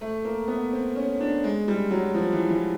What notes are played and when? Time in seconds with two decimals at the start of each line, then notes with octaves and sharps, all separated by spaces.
0.01 A3
0.25 A#3
0.48 B3
0.72 C4
0.95 C#4
1.20 D4
1.44 G#3
1.68 G3
1.91 F#3
2.14 F3
2.32 E3
2.50 E3